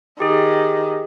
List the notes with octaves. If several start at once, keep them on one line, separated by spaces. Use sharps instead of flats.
D#3 G4 G#4